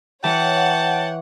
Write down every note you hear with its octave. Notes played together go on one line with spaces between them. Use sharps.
E3 C#5 F#5 G5 A5